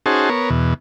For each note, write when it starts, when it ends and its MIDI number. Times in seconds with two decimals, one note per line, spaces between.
0.06 0.29 61
0.06 0.29 63
0.06 0.29 66
0.06 0.29 68
0.06 0.29 72
0.06 0.29 81
0.29 0.50 59
0.29 0.50 70
0.29 0.50 73
0.50 0.74 40
0.50 0.74 47